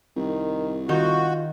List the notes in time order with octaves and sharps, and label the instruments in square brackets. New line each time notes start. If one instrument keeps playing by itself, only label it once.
[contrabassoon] C2 [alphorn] D#3
[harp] D#3 G6 [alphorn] F4 [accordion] F#4